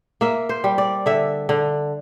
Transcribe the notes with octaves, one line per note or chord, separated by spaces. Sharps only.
A#3 E5
C5
G3
D5
D3 E5
D3